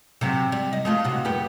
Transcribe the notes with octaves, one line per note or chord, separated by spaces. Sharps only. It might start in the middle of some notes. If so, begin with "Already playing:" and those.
C3 F#3 C4
G3
D#5
G#3 A3 F4
C3 F#4
F#2 B3 G4